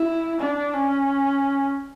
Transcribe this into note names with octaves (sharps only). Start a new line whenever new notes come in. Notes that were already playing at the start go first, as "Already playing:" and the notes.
Already playing: E4
D4
C#4